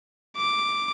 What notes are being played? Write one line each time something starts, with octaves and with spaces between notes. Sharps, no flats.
D6